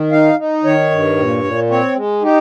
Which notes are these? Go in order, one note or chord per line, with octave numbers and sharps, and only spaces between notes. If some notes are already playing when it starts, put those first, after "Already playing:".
Already playing: D#3
D#4 F5
D#4
D#3 C#5
G2
A#2
A#2
C4 C#5
G#3
D#4 G4